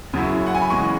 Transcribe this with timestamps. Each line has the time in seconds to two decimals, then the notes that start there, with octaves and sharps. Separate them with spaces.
0.13 F#2 C#3 F#3 E4
0.46 F#5
0.55 G#5
0.62 B5
0.70 C#3 E3 G#3 C#6